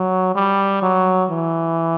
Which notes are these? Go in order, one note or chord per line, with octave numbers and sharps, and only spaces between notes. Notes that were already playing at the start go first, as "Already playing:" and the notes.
Already playing: F#3
G3
F#3
E3